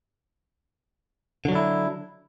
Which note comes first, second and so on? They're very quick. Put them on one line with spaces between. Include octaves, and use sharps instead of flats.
D3 F#3 D4 E4